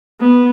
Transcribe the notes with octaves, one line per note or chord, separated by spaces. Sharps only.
B3